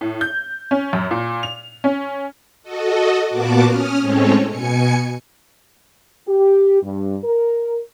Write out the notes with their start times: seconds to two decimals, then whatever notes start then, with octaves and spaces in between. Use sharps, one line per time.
0.01 A2
0.21 G6
0.71 C#4
0.93 F#2
1.11 A#2
1.43 F7
1.84 C#4
2.63 F#4 A4 D#5
3.28 A#2 A#3 B3 F#4 A5 D6
3.64 C#4 D#6 F6
4.02 A2 G#3 C4 C#4 A4 C#5
4.48 B2 G#5 C#7
6.27 G4
6.82 G2
7.24 A#4